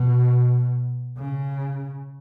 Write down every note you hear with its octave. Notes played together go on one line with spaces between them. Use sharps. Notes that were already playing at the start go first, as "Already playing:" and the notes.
Already playing: B2
C#3